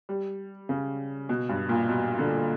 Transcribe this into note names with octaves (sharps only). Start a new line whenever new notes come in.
G3
C#3
B2
G2
A#2
B2
D3